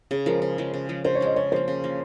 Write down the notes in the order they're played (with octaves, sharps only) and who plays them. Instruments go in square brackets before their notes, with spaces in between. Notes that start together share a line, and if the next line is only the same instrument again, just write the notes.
[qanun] C#3 [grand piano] G#4
[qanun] F3 G#3 [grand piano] A#4
[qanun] C#3
F3 G#3
C#3
F3 G#3
[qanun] C#3 [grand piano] C5
[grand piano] C#5
[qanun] F3 G#3 [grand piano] D#5
[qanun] C#3 [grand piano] C#5
[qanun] F3 A#3 [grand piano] C5
[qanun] C#3
F3 A#3